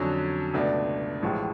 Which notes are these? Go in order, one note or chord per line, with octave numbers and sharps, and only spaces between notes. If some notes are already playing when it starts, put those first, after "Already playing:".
Already playing: F2 D3 F#3 C#4
C#2 B2 A3 D4
A1 A2 F3 G#3